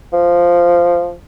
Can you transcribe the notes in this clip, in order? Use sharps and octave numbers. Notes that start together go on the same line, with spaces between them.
F3